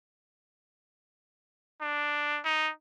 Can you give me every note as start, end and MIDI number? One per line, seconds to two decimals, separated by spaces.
1.81 2.40 62
2.45 2.71 63